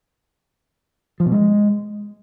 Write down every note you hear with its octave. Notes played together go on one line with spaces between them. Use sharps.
F3
B2
G#3